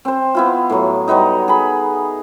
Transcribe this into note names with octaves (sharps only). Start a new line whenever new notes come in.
C4 C5
B3 E4 F4
A2 F#3
F#3 G3 B3 D#4
G#4 B5